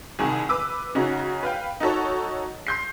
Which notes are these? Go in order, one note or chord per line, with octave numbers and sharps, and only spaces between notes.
C2 D#3 G#4
B4 D6 E6
C#3 C#4 D#4 F#4
B4 F5 G5
D#4 F#4 A4 C#5
C6 G6 C7